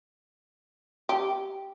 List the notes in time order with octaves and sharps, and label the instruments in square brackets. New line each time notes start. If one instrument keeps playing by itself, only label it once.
[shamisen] G4